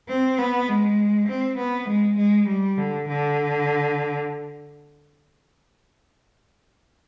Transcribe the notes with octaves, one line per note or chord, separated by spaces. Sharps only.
C4
B3
G#3
C4
B3
G#3
G#3
G3
D3
D3